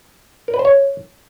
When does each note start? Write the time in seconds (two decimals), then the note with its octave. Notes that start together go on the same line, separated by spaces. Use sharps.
0.48 A#4
0.54 B4
0.59 C5
0.65 C#5